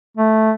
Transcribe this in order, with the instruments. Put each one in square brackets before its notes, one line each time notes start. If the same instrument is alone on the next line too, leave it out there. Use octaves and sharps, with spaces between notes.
[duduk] A3